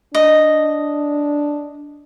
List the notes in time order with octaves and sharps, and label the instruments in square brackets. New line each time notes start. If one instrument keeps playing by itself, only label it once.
[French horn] D4 [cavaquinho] D#5